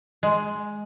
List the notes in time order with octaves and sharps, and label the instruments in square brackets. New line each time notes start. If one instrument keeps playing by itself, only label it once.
[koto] G#3